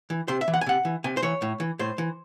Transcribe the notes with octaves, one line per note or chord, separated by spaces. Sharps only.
E3
C3 C5
E5
E3
F#5
G#5
C3 F#5
E3
C3 G#5
C5
E3 C#5
A2
E3
A2 C5
E3